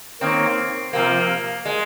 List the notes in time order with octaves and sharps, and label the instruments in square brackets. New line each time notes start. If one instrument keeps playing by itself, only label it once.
[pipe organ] D#3 A#3 D#4 A#4 C#5 [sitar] C4
[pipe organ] C3 F3 C4 F4 C5 [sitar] A#3
[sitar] G#3